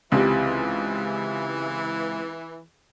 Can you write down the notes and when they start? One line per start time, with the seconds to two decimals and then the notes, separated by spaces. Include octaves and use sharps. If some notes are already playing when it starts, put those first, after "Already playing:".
0.12 C#2 C3 E3